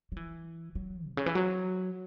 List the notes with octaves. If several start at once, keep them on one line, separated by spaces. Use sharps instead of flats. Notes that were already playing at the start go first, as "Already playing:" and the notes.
F#3
E3
F#3
B2
C#3
E3
F#3